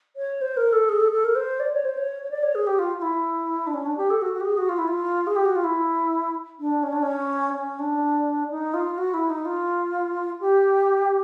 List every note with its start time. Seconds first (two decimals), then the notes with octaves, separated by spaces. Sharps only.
0.16 C#5
0.41 C5
0.57 A#4
0.72 A4
0.89 G#4
1.00 A4
1.12 A4
1.24 A#4
1.35 C5
1.59 D5
1.73 C#5
1.84 C5
1.97 C#5
2.23 C#5
2.30 D5
2.43 C#5
2.55 G#4
2.66 G4
2.78 F4
2.98 F4
3.02 E4
3.66 D4
3.73 C#4
3.85 D4
3.97 G4
4.10 A4
4.21 F#4
4.33 F#4
4.40 G4
4.45 G#4
4.57 F#4
4.69 F4
4.78 E4
4.87 F4
5.26 G#4
5.35 G4
5.45 F#4
5.55 F4
5.64 E4
6.59 D4
6.83 C#4
6.92 D4
7.02 C#4
7.55 C#4
7.79 D4
8.50 D#4
8.73 F4
8.98 F#4
9.13 E4
9.29 D#4
9.45 F4
10.40 G4